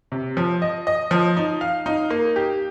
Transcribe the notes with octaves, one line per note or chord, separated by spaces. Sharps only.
C3
F3
D#5
D#5
F3
D#4
F5
D#4
A#3
G4